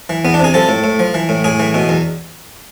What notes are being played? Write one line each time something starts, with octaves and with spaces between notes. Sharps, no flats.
E3
E2 B3
D4
C3 G#4
F3 A4
A2
A2
F3
E3
A2
A2 G#4
E3
B2
E2